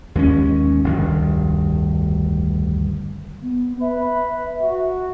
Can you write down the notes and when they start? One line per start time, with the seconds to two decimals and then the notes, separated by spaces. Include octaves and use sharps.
0.15 D#2 G#3 B3 C#4
0.84 F1 D2 G2 D#3
3.42 B3
3.81 B4 E5
4.60 F#4